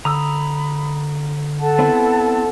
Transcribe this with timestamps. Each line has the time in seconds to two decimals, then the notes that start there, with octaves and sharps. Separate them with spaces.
0.05 D3 A#5 B5 D#6 E6
1.60 A4 F#5 A5
1.79 B3 C4 E4